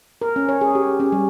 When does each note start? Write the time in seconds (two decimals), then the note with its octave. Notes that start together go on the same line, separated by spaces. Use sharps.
0.22 A#4
0.36 C#4
0.49 C#5
0.61 G#4
0.75 G4
1.00 C#4
1.12 G3